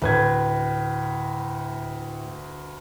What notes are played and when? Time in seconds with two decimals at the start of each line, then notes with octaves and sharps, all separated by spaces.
0.02 D2 A2 B4 G#6